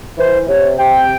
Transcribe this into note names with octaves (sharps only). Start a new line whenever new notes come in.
E3 C5
C3 C#5
C3 G5